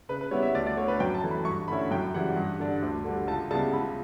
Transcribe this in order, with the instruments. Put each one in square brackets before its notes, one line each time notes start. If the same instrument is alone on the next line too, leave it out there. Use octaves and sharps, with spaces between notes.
[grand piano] C#3 B4
B4
G3 B3 E4 C#5
E5
D2 D5
D5
D3 C#5
A3
B4
F#2 G5
A5
E3 A3
B5
G2 C#6
D3 A3 C#4 E4 B5
F#2 G5
C#3 E3 G3 F#5
G2
D3 G3 D4
D2
D3 G3
C#2 A5
C#3 G3 B3 E4 A5
C#2 B5